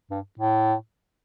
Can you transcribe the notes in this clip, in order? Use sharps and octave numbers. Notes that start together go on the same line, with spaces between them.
G2
A2